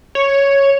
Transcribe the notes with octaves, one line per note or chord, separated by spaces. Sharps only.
C#5